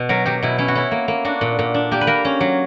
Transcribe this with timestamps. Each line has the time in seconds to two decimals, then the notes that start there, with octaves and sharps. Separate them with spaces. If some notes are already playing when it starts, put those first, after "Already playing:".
Already playing: B2
0.09 F#3 A#4
0.26 F#3 G4
0.43 B2 E4
0.58 C#4 E4
0.68 F#4
0.75 C#4 E4
0.91 A#3
1.08 A#3
1.25 D4 F#4
1.41 A#2
1.59 A#2
1.74 D4
1.91 A#3 G4
2.01 B4
2.07 A#3 A#4
2.25 C#4
2.40 F#3